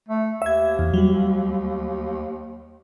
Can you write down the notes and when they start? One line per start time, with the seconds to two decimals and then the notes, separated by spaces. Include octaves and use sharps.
0.08 A3
0.42 D#2 E5 G#6
0.79 E2
0.94 F#3 G3